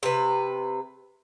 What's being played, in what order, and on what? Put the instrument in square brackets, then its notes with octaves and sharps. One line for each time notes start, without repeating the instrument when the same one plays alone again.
[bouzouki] C3 B4